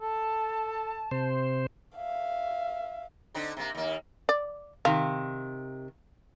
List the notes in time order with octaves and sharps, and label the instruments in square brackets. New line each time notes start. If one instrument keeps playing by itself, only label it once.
[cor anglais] A4 [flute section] A5
[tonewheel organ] C3 C5
[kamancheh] E5 F5
[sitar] D3 C4 D#4
C3 A#3
D#2 A#3
[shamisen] D5
[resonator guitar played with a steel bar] C3 D#3 [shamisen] F5